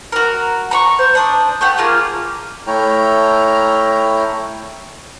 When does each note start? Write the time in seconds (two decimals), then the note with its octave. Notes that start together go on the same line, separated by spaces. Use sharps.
0.12 F#4 A#4
0.71 A#5 B5 C#6
0.99 C5
1.15 D4 D#6
1.61 A3 G4 F#5
1.78 A#3 F4 G#4
2.67 A3 E4 C#5 G5 A#5 F6